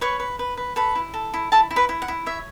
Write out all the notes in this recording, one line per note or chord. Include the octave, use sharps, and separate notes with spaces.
B4 C#5 C#6
B4
B4
B4
A4 B4 B5
E4
A4
E4
E4 A4 A5
E4
B4 B5
E4
F#5
E4
C#5 E5